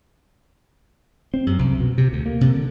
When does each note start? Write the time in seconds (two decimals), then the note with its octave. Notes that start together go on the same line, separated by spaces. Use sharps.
1.34 C4
1.46 F#2
1.59 C2
1.80 B2
1.98 C3
2.13 D2
2.26 A#3
2.41 C3
2.54 D3